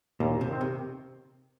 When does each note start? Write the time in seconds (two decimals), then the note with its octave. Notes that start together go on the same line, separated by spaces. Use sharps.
0.20 D#2 A#2
0.41 C3
0.51 D#3 C4
0.61 C3